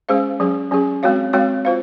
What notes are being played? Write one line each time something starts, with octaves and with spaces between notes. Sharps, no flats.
G#3 C#4 G#4 C5 F5
F#3 C#4 G#4
F#3 C#4 G#4
G#3 C4 F#4 C#5 F5
G#3 C4 F#4 C#5 F5
F4 C5 F5